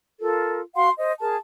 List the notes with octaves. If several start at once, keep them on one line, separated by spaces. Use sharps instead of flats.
F4 A4 A#4
F#4 F5 F#5 C6
C5 D#5
G#4 A#4 A5